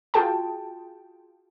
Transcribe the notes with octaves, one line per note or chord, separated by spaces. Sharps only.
F4 F#4 G#4 G5 A5